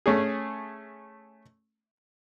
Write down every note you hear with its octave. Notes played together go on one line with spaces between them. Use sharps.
A3 C#4 G#4